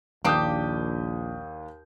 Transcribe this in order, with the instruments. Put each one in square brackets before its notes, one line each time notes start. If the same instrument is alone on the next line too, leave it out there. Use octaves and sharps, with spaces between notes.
[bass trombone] A#1 [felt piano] D#2 D#6 G6 [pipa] A#3 D4 G4